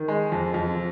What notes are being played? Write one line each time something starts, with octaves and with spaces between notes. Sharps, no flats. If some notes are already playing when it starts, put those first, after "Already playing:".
Already playing: D#3
G#3
F2
F2